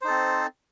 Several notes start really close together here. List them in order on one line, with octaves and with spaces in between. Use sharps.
C5 D#4 A4 C4